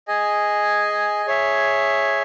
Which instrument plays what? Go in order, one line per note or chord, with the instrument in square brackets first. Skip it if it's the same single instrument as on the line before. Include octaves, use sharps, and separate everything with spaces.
[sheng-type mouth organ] G#4 D#5 G#5
G#4 C#5 E5